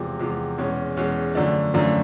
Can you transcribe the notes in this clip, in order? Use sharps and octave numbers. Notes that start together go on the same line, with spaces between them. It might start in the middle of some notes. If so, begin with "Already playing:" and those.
Already playing: E2 C3 F3 G#3
E2 C3 F3 G#3
E2 B2 G#3 C#4
E2 B2 G#3 C#4
F#2 D3 F3 A3 D4
F#2 D3 F3 A3 D4